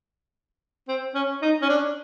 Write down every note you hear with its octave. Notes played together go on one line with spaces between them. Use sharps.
C4
C#4
D#4
C#4
D4